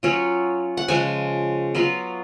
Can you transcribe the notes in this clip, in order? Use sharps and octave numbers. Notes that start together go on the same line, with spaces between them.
F#3 C#4 F4
F#5
C#3 F3 G#3 G#5
F#3 B3 F4